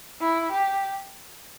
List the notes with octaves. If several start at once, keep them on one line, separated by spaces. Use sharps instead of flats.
E4
G4